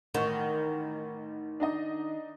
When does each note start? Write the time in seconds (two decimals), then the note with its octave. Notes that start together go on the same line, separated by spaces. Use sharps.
0.14 A1 D#3 C#6
1.60 D4 D#4 D#5